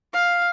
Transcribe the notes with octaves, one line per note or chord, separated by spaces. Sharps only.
F5